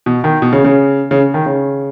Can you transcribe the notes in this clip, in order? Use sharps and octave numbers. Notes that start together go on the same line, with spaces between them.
B2
D#3
B2
C#3
C#3
C#3
D#3
C#3